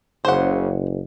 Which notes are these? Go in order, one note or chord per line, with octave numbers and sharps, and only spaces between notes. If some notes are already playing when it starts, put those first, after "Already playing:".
F#1 C#3 C5 F#5